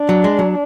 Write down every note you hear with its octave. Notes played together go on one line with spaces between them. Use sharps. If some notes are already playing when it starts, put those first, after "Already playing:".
Already playing: D4
F#3
G#3
F#3